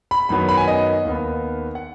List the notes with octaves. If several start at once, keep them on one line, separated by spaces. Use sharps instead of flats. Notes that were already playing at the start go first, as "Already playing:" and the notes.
B5
F#2 D#3 F#3 B3 B5
B5
G#5
D#5
D#2 D#3 B3
F#5